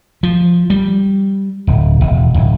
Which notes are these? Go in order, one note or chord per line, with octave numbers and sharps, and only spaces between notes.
F3
G3
D1
E1
D1